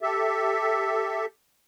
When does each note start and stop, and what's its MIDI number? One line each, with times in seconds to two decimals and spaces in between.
0.01 1.25 67
0.01 1.25 69
0.01 1.25 76